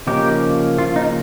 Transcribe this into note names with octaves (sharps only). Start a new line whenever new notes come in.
C#3 F3 A#3 C#4 D#4 G4
F4
D#4